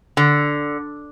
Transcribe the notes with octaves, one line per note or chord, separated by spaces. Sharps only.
D3